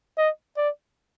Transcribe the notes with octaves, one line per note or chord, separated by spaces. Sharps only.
D#5
D5